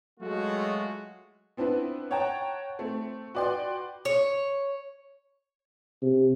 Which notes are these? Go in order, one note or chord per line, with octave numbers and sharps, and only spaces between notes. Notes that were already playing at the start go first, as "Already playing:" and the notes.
F#3 G#3 A3 F4 F#4
B3 C4 D4 E4 B4
C#5 F#5 G5 A5 A#5
A3 C4
F#4 B4 D5 G5 C6
C#5
C3